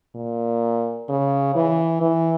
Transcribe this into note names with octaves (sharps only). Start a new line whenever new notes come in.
A#2
C#3
E3
E3